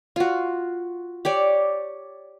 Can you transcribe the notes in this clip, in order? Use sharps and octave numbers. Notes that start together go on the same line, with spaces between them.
F4 F#4
G4 C#5 D5